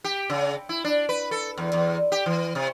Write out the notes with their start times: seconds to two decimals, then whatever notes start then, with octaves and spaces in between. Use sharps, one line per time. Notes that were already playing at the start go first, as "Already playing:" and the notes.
0.04 G4
0.30 C#3
0.69 E4
0.85 D4
1.09 B4
1.31 A4
1.58 E2
1.73 E2
2.12 G4
2.26 E3
2.55 C3